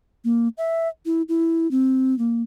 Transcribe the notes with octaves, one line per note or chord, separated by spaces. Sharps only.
A#3
E5
E4
E4
C4
A#3